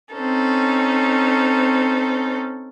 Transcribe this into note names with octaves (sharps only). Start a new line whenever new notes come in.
C4 C#4 D#4 A4